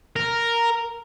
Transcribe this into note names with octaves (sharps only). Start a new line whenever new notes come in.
A#4